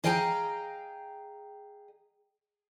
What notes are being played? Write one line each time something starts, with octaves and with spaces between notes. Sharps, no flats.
G#4 D#5 F5 G5 G#5 A#5